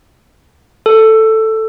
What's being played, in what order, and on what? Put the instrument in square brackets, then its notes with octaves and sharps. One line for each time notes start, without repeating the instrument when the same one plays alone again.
[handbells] A4